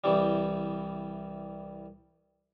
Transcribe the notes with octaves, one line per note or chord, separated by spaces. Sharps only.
C2 E3 G3